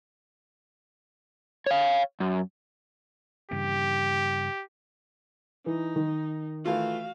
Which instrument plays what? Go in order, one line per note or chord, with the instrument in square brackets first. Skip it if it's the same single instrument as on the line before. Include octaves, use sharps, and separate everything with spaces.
[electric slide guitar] C#5 F5
F#2
[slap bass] G2 C#3 E3 [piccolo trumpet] G4
[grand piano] E3 [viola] D#4
[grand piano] D#3
[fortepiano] E3 A3 F4 [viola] F#4 F5